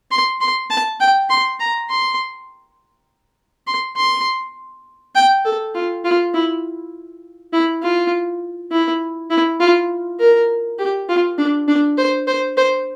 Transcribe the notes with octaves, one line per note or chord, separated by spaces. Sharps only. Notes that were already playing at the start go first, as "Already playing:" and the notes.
C6
C6
A5
G5
C6
A#5
C6
C6
C6
G5
A4
F4
F4
E4
E4
F4
E4
E4
F4
A#4
G4
F4
D4
D4
C5
C5
C5